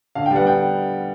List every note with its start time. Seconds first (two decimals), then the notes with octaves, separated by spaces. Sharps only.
0.15 D3 F5
0.26 G5
0.31 G3 B3 F#5
0.47 D3 G5